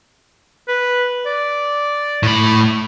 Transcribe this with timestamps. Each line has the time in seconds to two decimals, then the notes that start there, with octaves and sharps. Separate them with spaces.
0.68 B4
1.26 D5
2.23 A2 B5